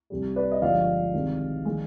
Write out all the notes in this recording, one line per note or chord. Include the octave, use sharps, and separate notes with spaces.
C2 C3 G3
B4 D5
D#5
G1 G2 F3 G#3 D5 F5
C2 C3 D#3 G#3
D#3 G#3